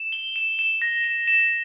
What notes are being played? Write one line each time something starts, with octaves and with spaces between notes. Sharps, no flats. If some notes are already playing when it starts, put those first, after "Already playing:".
Already playing: E7
G7
E7
E7
A#6
E7
E7